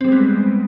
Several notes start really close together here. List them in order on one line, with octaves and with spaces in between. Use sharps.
C4 G3 G#3 B3